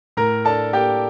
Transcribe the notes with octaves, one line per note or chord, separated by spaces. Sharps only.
A2 A#4 A#5
D4 A4 A5
A#3 G4 G5